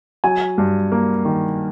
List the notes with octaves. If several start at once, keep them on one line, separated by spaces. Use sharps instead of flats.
F#3 G#5
G2
A#3
D#3